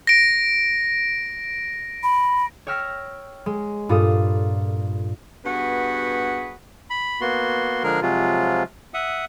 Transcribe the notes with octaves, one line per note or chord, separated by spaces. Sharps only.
A#6 D7
B5
C#5 G5 E6 F6 A#6 B6
G#3
G2 A#2 F4 A4 D#6
G2 B3 F#4 G#4 B4
B5
A#3 B3 F#4 C6
D3 F3 G#3 G#4 A#4
C3 F3 F#3 G#3 F4
E5 F#5 D#6